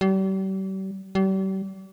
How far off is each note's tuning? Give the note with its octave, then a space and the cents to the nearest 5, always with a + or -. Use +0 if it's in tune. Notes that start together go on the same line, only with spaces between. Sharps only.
G3 -40
G3 -40